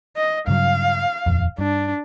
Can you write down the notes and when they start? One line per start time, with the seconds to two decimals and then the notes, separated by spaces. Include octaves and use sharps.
0.16 D#5
0.47 G2 C#3 F#3 F5
1.26 D#1 F2
1.58 G2 D4